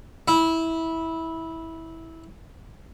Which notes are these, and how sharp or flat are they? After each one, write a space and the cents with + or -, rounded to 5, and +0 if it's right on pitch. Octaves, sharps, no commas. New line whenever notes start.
E4 -15